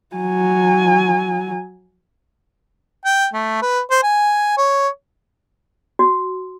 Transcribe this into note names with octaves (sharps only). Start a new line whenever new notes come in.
F#3 G#5
G5
A3
B4
C5
G#5
C#5
F#4